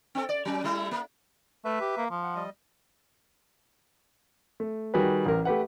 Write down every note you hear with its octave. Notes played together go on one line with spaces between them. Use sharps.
C4 C#4 A4
D5
F#3 C#4
G3 A3 E4
A#3
A3 B4 E5
G4
A#3
F3
F#5
G3 D#5
A3
D#3 G3 F#4 G#4 B4
A1 A#4
A3 G4 B4 F#5